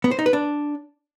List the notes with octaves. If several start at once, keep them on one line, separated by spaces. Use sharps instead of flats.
B3
C5
D#4
B4
D4